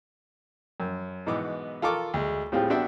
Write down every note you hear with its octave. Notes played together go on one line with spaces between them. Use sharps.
F#2
G#2 B2 E3 B3 D6
F4 A4 A#4 C#6 D6
D2 G#3
A2 G3 C4 F4 G4 G#4
B3 D4 F#4 E5 G5